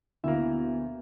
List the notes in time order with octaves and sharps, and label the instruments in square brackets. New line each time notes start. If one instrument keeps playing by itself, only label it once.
[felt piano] D2 [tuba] B2 [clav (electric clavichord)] A#3 E5 [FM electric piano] E4